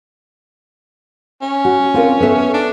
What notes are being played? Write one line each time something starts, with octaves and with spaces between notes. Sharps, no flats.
C#4
F#4
C4 F4 A#4
B3 A4 E5
D4